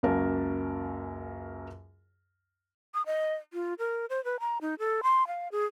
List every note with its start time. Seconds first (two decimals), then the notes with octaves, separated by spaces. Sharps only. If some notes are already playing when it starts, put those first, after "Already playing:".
0.03 C#2 F#2 A#3 F#4 A#4 A5
2.94 D#6
3.06 D#5
3.53 F4
3.79 A#4
4.10 C5
4.24 B4
4.40 A#5
4.61 D#4
4.79 A4
5.03 C6
5.27 F5
5.52 G#4